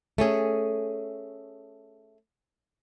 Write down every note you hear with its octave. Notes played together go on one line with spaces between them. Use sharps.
A3 C#4 G#4